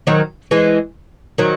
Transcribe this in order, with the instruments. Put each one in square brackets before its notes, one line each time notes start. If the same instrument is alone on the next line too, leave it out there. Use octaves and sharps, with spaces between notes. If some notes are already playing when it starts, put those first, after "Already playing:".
[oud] D#3 F#3
E3 G#3
D#3 F#3